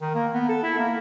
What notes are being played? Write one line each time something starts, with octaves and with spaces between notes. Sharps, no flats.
D#3
A#3
B3
A4
E4
A#3